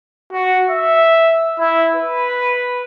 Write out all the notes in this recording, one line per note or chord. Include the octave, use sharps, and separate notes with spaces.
F#4
E5
E4
B4